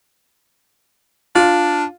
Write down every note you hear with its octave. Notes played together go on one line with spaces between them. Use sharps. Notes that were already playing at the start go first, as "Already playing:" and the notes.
D4 F4